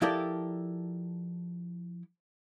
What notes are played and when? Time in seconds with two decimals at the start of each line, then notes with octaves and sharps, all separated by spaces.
0.02 F3 E4 G4 A4 A#4 D5